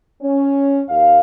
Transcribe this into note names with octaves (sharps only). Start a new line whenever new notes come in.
C#4
D#2 F5